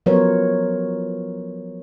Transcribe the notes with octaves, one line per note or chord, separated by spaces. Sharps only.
F3 F#3 B3 A#4 C5 C#5